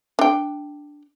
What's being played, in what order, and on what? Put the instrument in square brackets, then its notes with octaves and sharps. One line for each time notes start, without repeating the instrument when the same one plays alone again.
[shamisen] D4 G5